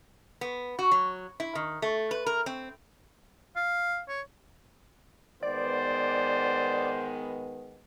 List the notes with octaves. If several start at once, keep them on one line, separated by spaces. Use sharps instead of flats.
B3
F#4
F#3
E4
D#3
A3
B4
A#4
C4
F5
C#5
D#3 G#3 B3 C5 D5